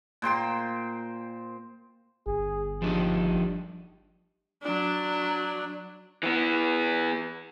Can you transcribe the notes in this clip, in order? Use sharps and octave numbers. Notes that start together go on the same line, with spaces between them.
A#2 C5 G5 C6
G1 G#4
F3 G3 D4 D#4
F#3 D4
E3 B3